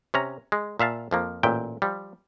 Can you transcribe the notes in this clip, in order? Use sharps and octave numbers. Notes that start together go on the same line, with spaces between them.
C3 C#4 A#5
G#3
A#2 E5 F5 A5
F2 F3 A#3
A1 A#2 E5 G5
F3 G3